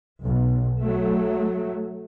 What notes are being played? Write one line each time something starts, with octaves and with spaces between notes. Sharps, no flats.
B1
F#3 A3